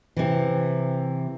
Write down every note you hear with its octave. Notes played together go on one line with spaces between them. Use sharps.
C3 E3